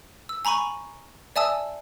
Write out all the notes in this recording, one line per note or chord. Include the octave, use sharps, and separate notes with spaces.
E6
G#5 A#5 B5 C#6 D#7
D5 E5 G#5 A5 D#6 E6